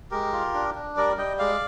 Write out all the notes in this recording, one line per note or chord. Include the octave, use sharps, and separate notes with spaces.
G#3 G4 A#4
F4
D4
D4
G3 A#4 D5
G3 D#5 G5
G#3 D5 F5